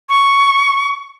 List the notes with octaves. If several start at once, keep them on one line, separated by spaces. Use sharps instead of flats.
C#6